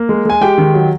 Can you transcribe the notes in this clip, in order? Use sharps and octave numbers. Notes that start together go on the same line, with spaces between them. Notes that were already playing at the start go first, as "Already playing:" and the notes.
Already playing: A#3
G#3
G#3 G#5
G#3 G4 G5
D#3
F#3